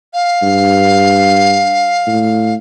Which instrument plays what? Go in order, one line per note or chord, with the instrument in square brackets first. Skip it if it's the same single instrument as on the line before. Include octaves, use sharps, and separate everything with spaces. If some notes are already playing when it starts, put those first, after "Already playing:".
[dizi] F5
[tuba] G2
A2